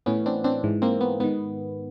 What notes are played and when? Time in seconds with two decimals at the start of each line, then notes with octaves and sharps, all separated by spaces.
0.06 A2 E3 B3 C#4
0.26 C4 D4
0.44 C4 D4
0.64 G#2 E3
0.82 A#3 C4
1.01 B3
1.20 G#2 D#3 B3